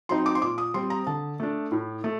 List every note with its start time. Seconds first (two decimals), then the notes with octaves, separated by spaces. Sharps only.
0.09 F#3 C4 D#4 C6
0.26 D6
0.35 C6
0.42 A#2 D6
0.58 D#6
0.74 G3 C4 C6
0.90 A#5
1.07 D3 A5
1.40 A3 D4
1.72 A2
2.04 A3